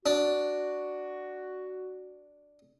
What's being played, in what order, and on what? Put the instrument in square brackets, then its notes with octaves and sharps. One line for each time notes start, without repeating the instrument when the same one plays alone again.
[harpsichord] D4 [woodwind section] F#4